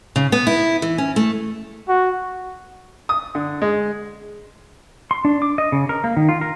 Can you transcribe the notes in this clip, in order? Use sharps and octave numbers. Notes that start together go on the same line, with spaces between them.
C#3
B3
E4
E3
C#4
A3
F#4
D#6
D3
G#3
C6
D4
D6
D#5
C#3
A#4
A#3
D#3
F4
A#4